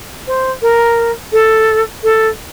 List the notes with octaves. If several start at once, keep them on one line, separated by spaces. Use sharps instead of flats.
C5
A#4
A4
A4